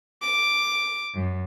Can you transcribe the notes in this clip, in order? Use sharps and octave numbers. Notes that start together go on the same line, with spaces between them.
D6
F#2